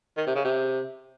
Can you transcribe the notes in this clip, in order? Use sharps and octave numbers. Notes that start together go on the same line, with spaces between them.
D#3
C3
C#3
C3